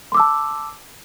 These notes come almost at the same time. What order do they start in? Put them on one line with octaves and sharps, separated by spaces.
C6 D6 E6 A5